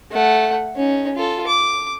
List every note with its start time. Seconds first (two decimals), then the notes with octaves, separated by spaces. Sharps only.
0.12 A3 F#5
0.76 C#4 D#4
1.15 F4 A4
1.47 D6